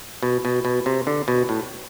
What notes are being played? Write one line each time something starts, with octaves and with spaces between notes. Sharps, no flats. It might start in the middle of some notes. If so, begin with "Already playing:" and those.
B2
B2
B2
C3
D3
B2
A2